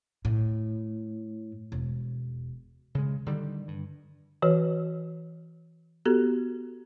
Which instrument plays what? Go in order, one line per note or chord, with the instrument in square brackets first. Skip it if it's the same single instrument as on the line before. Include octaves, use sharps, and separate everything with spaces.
[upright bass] A2
E1
[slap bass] C#3 G#3
D3 D#3 G3
G2
[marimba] E3 F#4 B4 C#5
B3 F#4 G4 A4